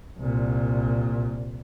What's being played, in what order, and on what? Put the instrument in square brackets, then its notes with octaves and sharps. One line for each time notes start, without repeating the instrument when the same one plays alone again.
[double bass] C2 A#2